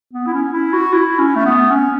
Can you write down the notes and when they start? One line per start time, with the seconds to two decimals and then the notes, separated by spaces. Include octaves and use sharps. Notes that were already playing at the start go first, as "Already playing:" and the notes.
0.13 B3
0.26 E4
0.34 C#4
0.53 E4
0.73 F#4
0.93 E4
1.18 C#4
1.35 A3
1.45 B3
1.71 C#4